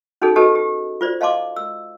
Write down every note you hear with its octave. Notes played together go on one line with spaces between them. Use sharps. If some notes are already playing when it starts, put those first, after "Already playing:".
C#4 D#4 F#4 G#4 A4
F#4 G4 A4 B4 D#5 A5
G4
F4 C5 D5
D#5 F5 A5 C6 D6
E6